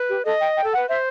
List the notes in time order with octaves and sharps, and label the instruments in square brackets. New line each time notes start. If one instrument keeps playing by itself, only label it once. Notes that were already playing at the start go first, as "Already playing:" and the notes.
Already playing: [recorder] B4
[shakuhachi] G4
[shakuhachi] A4 [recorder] D#5
[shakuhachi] G5
G5
[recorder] A4
[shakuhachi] F#5
[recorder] B4
[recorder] C5 [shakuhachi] E5